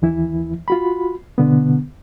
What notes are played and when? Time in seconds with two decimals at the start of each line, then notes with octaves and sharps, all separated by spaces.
0.02 D#2 E3 E4
0.68 F4 F#4 B5
1.38 B2 D3 B3